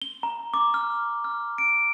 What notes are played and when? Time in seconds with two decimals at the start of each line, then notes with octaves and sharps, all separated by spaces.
0.02 G7
0.23 A#5
0.54 D6
0.74 F6
1.24 F6
1.58 D7